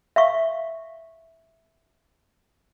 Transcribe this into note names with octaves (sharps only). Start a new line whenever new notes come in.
E5 F5 C#6